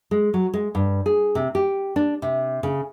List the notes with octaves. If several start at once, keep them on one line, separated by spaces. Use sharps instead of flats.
G#3
F#3
G#3
G2
G#4
C3
G4
D4
C3
C#3